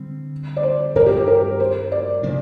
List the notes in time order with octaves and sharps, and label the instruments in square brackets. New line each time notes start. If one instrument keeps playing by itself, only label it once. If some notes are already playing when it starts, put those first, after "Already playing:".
Already playing: [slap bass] D3 G3 C4
[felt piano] D5
C5
[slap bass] G2 G3 C4 [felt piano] A#4
[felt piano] G4
G4
A#4
C5
D5
[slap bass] C3 F3 A#3 D4